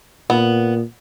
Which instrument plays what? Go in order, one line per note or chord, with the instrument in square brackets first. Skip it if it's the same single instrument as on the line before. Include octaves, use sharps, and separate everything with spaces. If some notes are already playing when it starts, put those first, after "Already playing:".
[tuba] A#2 [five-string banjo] B3